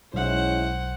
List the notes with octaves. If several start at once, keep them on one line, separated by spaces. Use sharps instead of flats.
B1 G#3 C#4 E4 C5 F#5